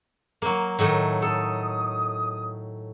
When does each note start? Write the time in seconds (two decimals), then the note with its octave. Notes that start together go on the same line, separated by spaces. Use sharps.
0.42 F#3 A#3 A#4
0.79 A2 D#3 F#3
1.22 A4 D#6